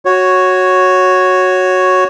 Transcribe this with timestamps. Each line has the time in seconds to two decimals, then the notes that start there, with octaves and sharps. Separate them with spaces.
0.05 F#4 C#5